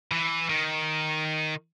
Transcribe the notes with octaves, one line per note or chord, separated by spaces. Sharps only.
E3
D#3